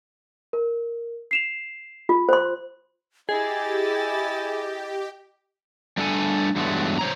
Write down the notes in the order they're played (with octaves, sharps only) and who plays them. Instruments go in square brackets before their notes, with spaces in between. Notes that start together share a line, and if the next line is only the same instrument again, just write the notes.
[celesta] A#4
C7 E7 F7
[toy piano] F4
C5 C6
[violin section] E4 G#5 A6 [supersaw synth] G4 [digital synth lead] G#4 [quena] D#5
[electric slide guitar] G3 A3 D4 A4 F5 G#5
E2 G2 F#3 G#3 A3
C5 C#5 A#5